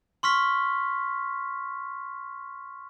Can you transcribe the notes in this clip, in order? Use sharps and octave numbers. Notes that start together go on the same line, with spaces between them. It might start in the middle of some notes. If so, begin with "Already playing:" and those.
C6 C#6 F6 B6